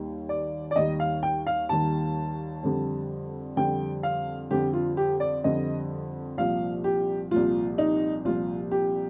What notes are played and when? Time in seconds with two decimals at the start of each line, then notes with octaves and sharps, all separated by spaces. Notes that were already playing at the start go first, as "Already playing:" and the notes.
Already playing: D#2 D#3 G3
0.29 D5
0.71 D5
0.76 D#2 D#3 G3 D#5
1.00 F5
1.23 G5
1.47 F5
1.69 D#2 D#3 G3 A5
2.63 F2 D3 G3
3.56 F2 D3 G3 G5
4.03 F5
4.50 F2 D3 G3 G4
4.73 F4
4.97 G4
5.20 D5
5.44 F2 D3 G3 D#5
6.38 C2 A#2 F3 F5
6.84 G4
7.31 C2 A#2 F3 F4
7.78 D#4
8.25 C2 A#2 F3 F4
8.71 G4